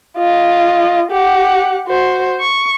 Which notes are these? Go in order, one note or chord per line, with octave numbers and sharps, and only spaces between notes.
F4 D#5
G4 F#5
F#4 C5
C#6